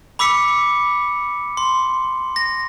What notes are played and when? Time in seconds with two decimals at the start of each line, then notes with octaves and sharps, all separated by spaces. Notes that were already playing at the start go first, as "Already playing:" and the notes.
0.19 B5 D6 E6 B6 C#7
1.57 C6
2.36 A#6